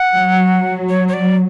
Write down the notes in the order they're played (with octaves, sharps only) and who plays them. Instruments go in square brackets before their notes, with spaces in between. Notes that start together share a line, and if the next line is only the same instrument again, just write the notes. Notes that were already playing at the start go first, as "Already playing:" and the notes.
Already playing: [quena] F#5
[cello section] F#3
[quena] C#5
C#5
D5